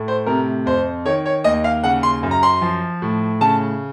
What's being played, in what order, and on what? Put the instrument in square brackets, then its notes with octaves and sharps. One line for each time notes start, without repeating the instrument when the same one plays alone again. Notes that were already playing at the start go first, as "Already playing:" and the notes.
Already playing: [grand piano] A2 A3
C5
C3 A#4
F2 C5
D#3 C#5
C#5
D#2 D#5
F5
C#3 F#5
C6
F#2
A#5
C6
F3
A2
C#3 A5